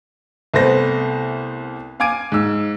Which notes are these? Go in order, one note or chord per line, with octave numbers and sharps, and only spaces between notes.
C2 A3 B3 C5 A#6
F5 G#5 D6 G#6 D7 D#7
G#2 E6